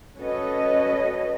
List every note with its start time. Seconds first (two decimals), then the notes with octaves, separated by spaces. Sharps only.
0.16 C#4 F#4 A4 B4 C#5 D#5